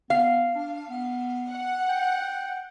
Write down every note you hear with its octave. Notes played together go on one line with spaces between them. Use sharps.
B3 F5
D4
B3
F#5
G5